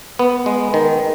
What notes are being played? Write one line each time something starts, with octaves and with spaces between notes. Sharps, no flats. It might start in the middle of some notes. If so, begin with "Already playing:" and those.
B3
G#3
D#3